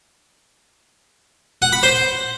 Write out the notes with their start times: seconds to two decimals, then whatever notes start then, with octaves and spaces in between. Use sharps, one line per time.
1.62 F#5
1.72 B5
1.83 C5